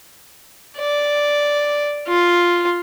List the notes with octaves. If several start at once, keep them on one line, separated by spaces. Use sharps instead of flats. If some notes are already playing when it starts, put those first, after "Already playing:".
D5
F4